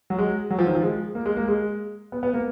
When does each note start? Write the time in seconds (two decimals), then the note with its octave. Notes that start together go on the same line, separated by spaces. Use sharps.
0.10 F#3
0.18 G#3
0.50 F#3
0.59 F3
0.67 D#3
0.75 F3
0.83 G#3
1.15 A#3
1.26 G#3
1.37 A#3
1.48 G#3
2.12 B3
2.23 B3
2.34 A#3